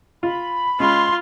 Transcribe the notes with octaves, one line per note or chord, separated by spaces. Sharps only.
F4 B5
G#3 C#4 F4 C6